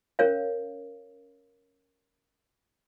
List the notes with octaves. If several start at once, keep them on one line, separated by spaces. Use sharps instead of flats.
C#4 A#4 C#5 F5